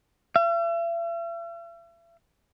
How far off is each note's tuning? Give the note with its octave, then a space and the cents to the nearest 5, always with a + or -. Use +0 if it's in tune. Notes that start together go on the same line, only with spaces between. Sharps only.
E5 +45